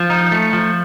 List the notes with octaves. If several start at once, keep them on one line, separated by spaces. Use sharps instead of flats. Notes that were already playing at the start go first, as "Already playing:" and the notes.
Already playing: F3
D#4
A3
F3